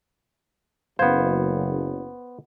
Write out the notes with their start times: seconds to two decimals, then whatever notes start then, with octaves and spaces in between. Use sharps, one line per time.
0.99 F#1 B3 C5 F5 G#6